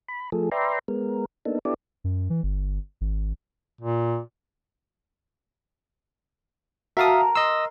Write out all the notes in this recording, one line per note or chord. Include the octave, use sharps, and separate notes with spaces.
B5
F3 A3 G#4 A4
B4 D5 E5 G5 A#5 C6
G#3 B3 A#4
A#3 B3 D4 D#4 A4
B3 D4 E4 G4 A4 D5
F#2
E3
G1
G#1
A#2
F#4 A#4 E5 F5 A5 D#6
D#5 C6 E6